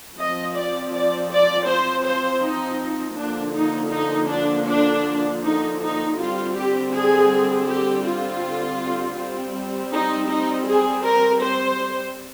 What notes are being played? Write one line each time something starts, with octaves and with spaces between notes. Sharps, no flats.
F3 C4 D#5
D5
D5
D5
C5
C5
D#4
D3 F3 A#3 D4
D#4
D#4
D4
D4
D#4
D#4
D3 G3 C4 F4
G4
G#4
G4
F4
G3 C4
D#4
D#4
G#4
A#4
C5